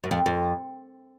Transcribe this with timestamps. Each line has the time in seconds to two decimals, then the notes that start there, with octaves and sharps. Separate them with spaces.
0.04 F#2
0.11 F2
0.26 F2